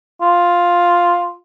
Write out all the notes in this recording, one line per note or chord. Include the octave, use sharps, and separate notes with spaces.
F4